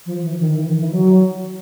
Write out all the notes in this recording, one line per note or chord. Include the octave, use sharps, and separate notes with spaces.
F3
E3
D#3
E3
D#3
E3
F#3